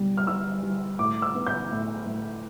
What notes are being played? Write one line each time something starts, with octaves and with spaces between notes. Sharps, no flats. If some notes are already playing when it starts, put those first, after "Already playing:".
Already playing: B2 G3
F6
G3 E6
G3
A2 D6
E6
B3
G6
A2
A2